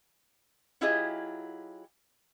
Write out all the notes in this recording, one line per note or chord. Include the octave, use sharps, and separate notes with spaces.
F#3 E4 F4 G4 G#4 D#5